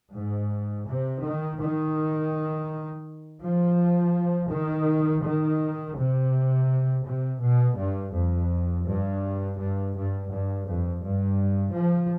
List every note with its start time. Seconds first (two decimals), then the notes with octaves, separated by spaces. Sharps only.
0.15 G#2
0.88 C3
1.24 D#3
1.61 D#3
3.41 F3
4.50 D#3
5.23 D#3
5.96 C3
7.05 C3
7.40 B2
7.77 G2
8.13 F2
8.85 G2
9.58 G2
9.95 G2
10.30 G2
10.67 F2
11.03 G2
11.75 F3